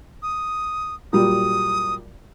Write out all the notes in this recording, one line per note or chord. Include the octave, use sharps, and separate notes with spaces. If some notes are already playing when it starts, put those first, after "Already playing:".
D#6
A#2 F#3 G3 D#6